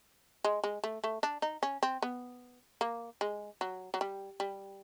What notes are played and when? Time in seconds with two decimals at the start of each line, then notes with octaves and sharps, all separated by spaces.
0.44 G#3
0.64 G#3
0.84 A3
1.04 A3
1.23 D4
1.42 D#4
1.63 C#4
1.83 C4
2.02 B3
2.81 A#3
3.21 G#3
3.61 F#3
3.94 F#3
4.01 G3
4.40 G3